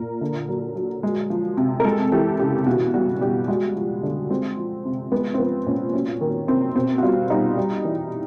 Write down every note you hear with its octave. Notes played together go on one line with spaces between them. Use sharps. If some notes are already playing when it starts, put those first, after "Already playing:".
Already playing: A#2 A#4
D3
F#3
F#3
G#3
F3
C3
A#4
G#3 A4
E3 G4
C#3 G4
B2 F#4
G3 F#4
G3 G4
G#3 F#4
F3
D3
G#3 C4
F3
C3
G#3 B3
C4
F3 B3
A#2 C#4
F#3 C#4
D#3
C3 C4
B2 C4
F#4
G3 F4
G3 D#4
G3
E3